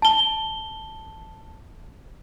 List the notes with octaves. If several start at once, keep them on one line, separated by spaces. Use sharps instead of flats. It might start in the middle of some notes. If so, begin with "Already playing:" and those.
A5 G7